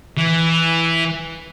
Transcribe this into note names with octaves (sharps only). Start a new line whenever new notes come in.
E3